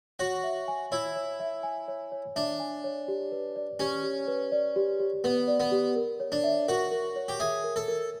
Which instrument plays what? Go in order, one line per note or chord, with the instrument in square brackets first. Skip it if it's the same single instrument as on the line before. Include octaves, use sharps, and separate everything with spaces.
[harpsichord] F#4 [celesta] C#5
[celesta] E5
G#5
[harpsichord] E4 [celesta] C#5
[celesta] C#5
E5
G#5
C#5
C#5
[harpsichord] D4 [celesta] E5
[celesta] G#5
C#5
G4
B4
D5
[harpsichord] C#4 [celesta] G4
[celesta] G4
B4
D5
G4
G4
[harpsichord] B3 [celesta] B4
[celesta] D5
[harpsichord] B3
[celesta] G4
A#4
C#5
[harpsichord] D4
[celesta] E5
[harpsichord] F#4 [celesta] A#4
[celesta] A#4
C#5
[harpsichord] G4
[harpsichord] G#4 [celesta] E5
[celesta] A#4
[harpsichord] A4
[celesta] A#4